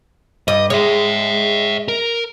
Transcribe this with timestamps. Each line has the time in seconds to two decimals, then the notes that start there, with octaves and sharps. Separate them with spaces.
0.48 G2 D#5
0.70 G#3 C#5 E5
1.88 A#4